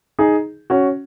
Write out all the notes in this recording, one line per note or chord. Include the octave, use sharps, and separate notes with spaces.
D#4 G#4
C#4 F#4